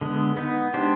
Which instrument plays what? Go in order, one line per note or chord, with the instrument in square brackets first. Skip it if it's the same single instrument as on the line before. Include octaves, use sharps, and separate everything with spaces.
[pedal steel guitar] D3 G#3 B3
B3 D#4 B4
G#3 D4 G4 C5